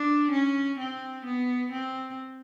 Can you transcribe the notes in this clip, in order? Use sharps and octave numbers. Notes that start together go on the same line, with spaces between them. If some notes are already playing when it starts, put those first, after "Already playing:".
Already playing: D4
C#4
C4
B3
C4